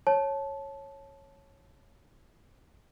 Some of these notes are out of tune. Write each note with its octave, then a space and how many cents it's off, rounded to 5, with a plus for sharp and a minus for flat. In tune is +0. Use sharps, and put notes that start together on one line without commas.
C#5 -10 A5 -15